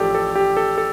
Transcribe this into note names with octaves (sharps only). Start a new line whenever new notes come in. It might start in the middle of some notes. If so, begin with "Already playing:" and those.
Already playing: A1 F3 G4 A4 D5
A4
G4
A4
A4